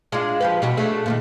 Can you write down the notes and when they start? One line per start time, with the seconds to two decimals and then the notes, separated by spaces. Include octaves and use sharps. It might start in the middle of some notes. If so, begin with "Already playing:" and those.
0.12 G#3 D4 F4
0.40 F3 G4 B4
0.62 B2 G3 F#4
0.77 A3 D4 G#4
1.06 A#2 D3 D#3